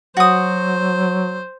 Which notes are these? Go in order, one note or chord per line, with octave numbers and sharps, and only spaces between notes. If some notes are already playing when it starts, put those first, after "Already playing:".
F#3 F#4 C5 D#6